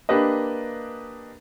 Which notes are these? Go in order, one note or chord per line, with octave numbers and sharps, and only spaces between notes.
A#3 D4 G4 B4 D#5